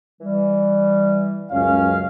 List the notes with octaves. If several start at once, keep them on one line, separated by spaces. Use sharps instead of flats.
E3 G3
C#2 F#2 C#4 F5